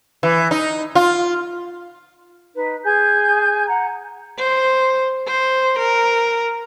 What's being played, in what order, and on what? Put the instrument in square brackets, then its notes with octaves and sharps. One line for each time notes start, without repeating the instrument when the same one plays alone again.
[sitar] E3
D#4
F4
[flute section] D#4 B4
G#4 G#5 G6
F#5 A#5
[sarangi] C5
C5
A#4